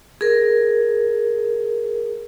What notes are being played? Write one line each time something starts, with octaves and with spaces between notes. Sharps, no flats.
G#4 A#4